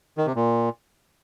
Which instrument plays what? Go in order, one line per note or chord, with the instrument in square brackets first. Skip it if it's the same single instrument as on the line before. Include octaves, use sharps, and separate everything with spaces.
[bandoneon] D#3
C3
A#2